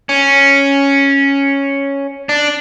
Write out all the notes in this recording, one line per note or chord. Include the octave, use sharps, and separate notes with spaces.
C#4
D4